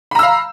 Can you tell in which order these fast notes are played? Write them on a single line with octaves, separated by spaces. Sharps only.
B5 A#5 E6 F5